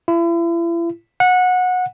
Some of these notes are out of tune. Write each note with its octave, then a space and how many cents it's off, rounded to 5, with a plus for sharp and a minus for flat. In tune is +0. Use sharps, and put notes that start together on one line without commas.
E4 +40
F#5 -20